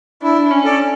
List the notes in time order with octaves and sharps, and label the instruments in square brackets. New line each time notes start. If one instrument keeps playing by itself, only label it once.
[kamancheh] D4 [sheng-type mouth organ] E4
[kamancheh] C#4
[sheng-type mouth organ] A4 D5